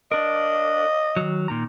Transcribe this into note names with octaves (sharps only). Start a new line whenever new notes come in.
D4 A#4 D#5
D#3 F#3
A#2 D#3 A#5